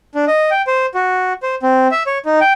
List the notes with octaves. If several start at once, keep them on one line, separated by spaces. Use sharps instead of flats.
D4
D#5
G5
C5
F#4
C5
C4
E5
C#5
D#4
G5